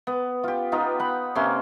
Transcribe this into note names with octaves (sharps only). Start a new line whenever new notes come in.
B3
F4 G4
B3 D#4 F4
F#5 B5
C3 A#3 C#4 C6